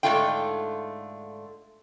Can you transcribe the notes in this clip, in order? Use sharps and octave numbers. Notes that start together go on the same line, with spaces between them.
G#2 D3 F3 A3 F4 G5